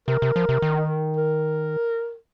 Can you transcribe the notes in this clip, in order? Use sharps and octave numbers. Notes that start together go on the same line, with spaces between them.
C3 A#4
C3
F3
C3
D#3
A#4